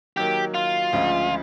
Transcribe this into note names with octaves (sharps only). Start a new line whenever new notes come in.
D#3 F#3 A#3 G4
F4
D2 C#3 F3 G#3